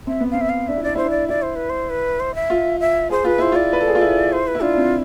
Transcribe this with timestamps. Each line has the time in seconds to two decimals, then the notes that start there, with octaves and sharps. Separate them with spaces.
0.07 C4 E5
0.20 B3
0.31 C4 F5
0.41 E5
0.49 F5
0.68 D4 E5
0.77 E4
0.83 D4 D5
0.95 E4 C5
1.03 D4
1.10 D5
1.29 E4 D5
1.42 C5
1.56 B4
1.70 C5
1.90 B4
2.20 C5
2.35 E5
2.50 F4
2.80 E5
3.10 G#4 C5
3.24 F4 B4
3.38 E4 C5
3.52 F4 D5
3.73 B4
3.81 A4
3.88 G#4
3.95 F4
4.01 E4
4.32 C5
4.47 B4
4.55 E4
4.62 D4 F4
4.72 D4
4.77 C4